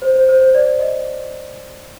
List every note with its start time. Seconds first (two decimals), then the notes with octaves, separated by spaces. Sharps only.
0.02 C5
0.15 C5
0.29 C5
0.41 C5
0.54 D5
0.79 D#5